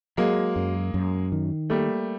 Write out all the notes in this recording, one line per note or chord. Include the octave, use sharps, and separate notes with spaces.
F#3 G#3 A#3
F#2
F#2
D#3
G3 A3 A#3